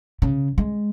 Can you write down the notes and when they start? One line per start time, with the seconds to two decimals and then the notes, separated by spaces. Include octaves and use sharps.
0.22 C#3
0.58 G#3